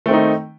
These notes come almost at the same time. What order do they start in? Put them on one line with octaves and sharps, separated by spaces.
A3 C4 D#3 D#4